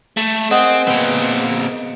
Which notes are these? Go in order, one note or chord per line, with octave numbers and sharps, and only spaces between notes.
A3 E7
C4 G#4 D#5 F#5
A#2 B3 C4